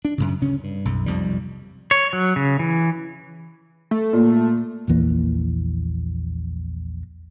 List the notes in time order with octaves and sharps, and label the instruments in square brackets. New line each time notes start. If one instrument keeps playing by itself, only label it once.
[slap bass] D4
F#2 A2 C#3
D2 C#3 C#4
G2
B1 F#2
B1 F2 C3 G3
[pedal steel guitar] C#5
F#3
C#3
E3
[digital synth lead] A3
[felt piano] A#2
[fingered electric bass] A#1 E2 E3 A#3